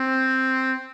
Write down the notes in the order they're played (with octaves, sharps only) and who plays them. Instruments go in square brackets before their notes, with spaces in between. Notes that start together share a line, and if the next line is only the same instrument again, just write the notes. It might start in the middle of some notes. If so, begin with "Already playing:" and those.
Already playing: [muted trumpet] C4